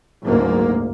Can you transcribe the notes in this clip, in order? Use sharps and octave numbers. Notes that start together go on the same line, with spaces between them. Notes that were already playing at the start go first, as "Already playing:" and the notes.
F#1 D2 G#2 A#3